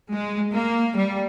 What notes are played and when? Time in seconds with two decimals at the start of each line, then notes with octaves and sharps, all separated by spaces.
0.14 G#3
0.53 A#3
0.98 G3